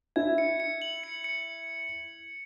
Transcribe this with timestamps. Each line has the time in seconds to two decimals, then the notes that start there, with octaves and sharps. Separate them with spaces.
0.16 E4 E5 G#6
0.38 C#7
0.60 C#7
0.82 F#7
1.04 C#7
1.24 C#7